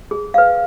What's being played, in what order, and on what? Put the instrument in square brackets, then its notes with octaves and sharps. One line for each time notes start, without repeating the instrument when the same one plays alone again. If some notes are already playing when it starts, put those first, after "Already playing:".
[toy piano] G#4
B4 F5